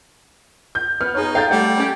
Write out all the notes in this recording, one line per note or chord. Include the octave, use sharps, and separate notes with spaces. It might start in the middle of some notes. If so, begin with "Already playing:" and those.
G6
B3 F6
D#4 G#4 C#5
A4 F5 G5 G6 A6
G3 A3 F#5
C#4 G4